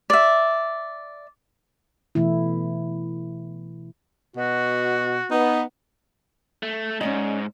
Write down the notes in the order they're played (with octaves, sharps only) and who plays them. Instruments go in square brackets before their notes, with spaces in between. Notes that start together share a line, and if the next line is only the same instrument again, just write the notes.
[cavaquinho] D5 E5
[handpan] B2 E3 A3 E4
[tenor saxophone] B2 [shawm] F#4
[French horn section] B3 [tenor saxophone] D#4
[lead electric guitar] A3
[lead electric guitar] G#2 [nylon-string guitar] C#4 D5 D#5